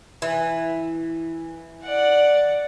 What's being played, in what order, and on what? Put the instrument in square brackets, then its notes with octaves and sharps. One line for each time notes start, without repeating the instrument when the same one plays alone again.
[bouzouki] E3
[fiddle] D5 F#5